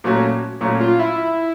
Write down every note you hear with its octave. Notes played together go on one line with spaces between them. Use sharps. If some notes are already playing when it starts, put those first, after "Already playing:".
A#2 F#3 A3 C#4 F#4
A#2 F#3 A3 C#4 F#4
F4
E4